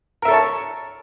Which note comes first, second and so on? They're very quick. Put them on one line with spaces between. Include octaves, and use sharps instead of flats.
A#4 E5 A4 C#5 A5